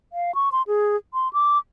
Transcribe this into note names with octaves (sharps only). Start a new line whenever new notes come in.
F5
C#6
C6
G#4
C6
D6